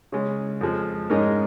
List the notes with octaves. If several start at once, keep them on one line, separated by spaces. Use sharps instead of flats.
C#3 G#3 C#4
F2 F3 G#3
G#2 G#3 C#4 A#4 D#5